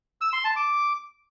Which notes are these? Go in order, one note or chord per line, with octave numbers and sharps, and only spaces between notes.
E6
C6
A5
D6